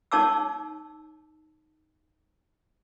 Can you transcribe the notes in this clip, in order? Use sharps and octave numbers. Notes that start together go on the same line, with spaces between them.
D#4 C#5 A5 D6 E6